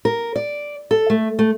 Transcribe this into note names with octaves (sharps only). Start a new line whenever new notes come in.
A#4
D5
A4
A3
A3